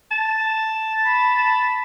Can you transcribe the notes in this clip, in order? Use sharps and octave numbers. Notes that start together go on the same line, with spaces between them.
A5
B5